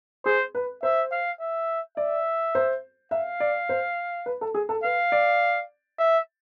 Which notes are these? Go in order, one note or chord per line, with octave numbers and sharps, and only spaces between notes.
G#4 C5
B4
C5 E5
F5
E5
D5 E5
C5
E5 F5
D5
C5
B4
A4
G#4
A4
B4 F5
D5
E5